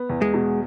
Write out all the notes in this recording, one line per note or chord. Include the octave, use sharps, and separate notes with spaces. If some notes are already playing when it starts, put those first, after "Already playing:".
Already playing: B3
E2
G#3
B2